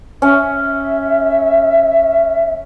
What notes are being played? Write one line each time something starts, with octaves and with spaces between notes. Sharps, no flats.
C#4 E5